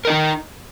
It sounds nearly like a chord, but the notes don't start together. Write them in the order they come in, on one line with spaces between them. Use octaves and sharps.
A#4 D#5 D#4